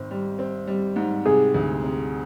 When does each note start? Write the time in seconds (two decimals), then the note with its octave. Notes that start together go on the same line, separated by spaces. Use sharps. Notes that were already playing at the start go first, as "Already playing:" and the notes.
Already playing: G#1 C4
0.11 G3
0.39 C4
0.67 G3
0.96 G#2
1.26 C3 G#4
1.54 D2
1.84 C3